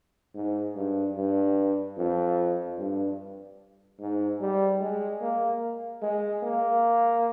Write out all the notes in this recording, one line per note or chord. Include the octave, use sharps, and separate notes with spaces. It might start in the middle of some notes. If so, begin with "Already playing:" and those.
G#2
G2
G2
F2
G2
G#2
G3
G#3
A#3
G#3
A#3